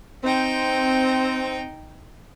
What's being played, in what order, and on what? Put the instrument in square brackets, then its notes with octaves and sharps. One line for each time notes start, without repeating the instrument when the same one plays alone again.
[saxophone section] C4 [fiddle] D#4 G5